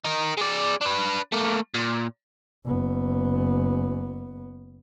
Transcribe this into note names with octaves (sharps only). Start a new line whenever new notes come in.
D#4 A#4
G#3 D5
D4 B4
A3 A#3
A#2
F#1 B3